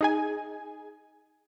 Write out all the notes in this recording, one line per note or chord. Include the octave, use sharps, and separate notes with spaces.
D#4 G#4 G#5